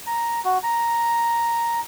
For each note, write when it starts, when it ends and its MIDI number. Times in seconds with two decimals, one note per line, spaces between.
0.07 0.40 82
0.45 0.58 66
0.63 1.80 82